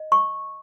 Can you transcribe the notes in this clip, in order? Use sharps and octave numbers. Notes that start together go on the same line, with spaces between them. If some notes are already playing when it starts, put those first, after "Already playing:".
Already playing: D#5
C#6